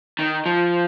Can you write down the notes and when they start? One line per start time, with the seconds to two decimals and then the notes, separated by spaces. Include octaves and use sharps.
0.19 D#3
0.46 F3